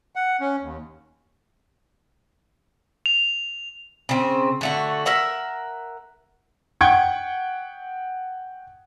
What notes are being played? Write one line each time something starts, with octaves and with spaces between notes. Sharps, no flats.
F#5
C#4
D#2
F7
C#3 C4
D3 A3 F#4
A#4 E5 F#5
F#5 G5 C#6 G6 G#6